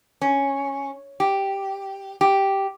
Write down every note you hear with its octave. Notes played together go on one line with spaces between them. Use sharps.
C#4
G4
G4